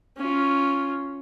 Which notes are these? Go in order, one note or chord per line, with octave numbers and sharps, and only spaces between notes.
C#4 F4